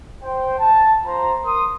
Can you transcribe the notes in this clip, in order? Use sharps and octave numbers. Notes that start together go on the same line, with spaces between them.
C5 G5
A5
F4 C5 A#5
A#4 C6 D#6